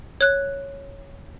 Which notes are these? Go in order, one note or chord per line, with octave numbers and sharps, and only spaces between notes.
C#5 F#6